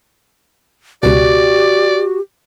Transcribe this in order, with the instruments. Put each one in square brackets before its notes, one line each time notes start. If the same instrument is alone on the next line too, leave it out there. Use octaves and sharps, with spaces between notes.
[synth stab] C#2 B2 [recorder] F#4 [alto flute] G4 [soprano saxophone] D5